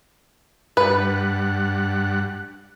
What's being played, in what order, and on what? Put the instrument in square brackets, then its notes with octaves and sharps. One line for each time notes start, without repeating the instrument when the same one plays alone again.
[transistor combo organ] G2 F#5 [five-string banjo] B4